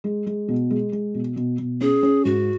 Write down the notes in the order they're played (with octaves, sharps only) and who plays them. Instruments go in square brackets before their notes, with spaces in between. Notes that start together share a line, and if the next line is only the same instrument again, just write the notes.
[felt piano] G#3
G#3
B2
G#3
G#3
B2
B2
B2
[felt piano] C#4 [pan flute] G#4
[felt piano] C#4
[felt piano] G#2 [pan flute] F#4